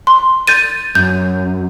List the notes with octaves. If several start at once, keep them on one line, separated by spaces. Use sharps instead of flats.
C6
G6 A6 D#7
F#2 G6